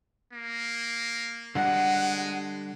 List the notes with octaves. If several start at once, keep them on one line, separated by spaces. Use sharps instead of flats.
A#3
D3 G3 G#3 D4 F#5